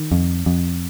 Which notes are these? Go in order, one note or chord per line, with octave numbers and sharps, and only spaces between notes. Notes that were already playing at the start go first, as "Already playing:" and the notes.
Already playing: D#3
F2
F2